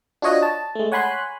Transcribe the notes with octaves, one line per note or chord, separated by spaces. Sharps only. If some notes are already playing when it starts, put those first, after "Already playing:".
D4 F4 F#4 C#5 D#5 F#5
A5
G#3 A3
C#5 F#5 G#5 B5 C6 F#6